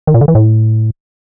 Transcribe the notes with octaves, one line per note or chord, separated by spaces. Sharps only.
D#3
A#2
D3
E3
A2